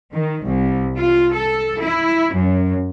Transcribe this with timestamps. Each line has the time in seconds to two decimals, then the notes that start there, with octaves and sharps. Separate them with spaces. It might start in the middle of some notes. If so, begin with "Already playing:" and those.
0.12 D#3
0.43 C2
0.95 F4
1.33 A4
1.80 E4
2.34 F#2